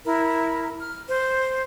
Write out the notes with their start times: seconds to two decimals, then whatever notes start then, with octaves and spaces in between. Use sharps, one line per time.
0.05 E4 A#4
0.80 F6
1.08 C5